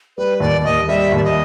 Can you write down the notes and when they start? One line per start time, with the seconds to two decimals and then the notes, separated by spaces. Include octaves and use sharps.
0.18 G3 B4
0.40 D#2 D5
0.64 D#2 D#5
0.88 G3 E5
1.12 D#2 D5
1.24 D#5